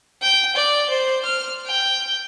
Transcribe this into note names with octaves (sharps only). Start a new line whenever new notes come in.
G5
D5
C5
F6
G5